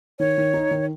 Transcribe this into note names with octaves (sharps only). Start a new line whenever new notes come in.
D#3 C#5
D#3
D#4
D#3